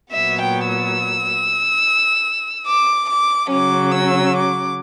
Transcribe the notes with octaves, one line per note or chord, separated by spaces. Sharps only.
A#2 F#3 B3 E5
G5
E6
D6
D6
C#3 F#3 C#4 D6
E6
D6